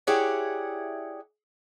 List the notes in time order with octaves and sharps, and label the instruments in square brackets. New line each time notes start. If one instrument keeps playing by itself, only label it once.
[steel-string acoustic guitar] E4 G4 G#4 C#5 D5 F#5